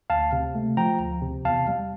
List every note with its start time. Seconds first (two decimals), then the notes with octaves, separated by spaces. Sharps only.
0.10 D2 F5 A5
0.32 C3
0.55 A3
0.77 F3 G5 A#5
0.99 D2
1.22 C3
1.45 E2 F5 A5
1.68 G3